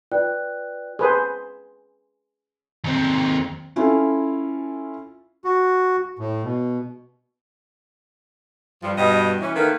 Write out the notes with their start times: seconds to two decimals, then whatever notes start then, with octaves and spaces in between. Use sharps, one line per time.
0.12 F4 B4 D5 G5 F#6
0.99 G#4 B4 C5
2.84 D#2 C4
3.76 C#4 E4 F4 A4
5.45 F#4
6.19 A2
6.43 B2
8.81 G2 F3
8.96 G2 B2 D#5
9.40 E3 C#4
9.54 D#3 A3 A#3 B4